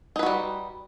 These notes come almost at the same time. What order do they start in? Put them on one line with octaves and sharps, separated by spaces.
D#4 B4 F#4 G3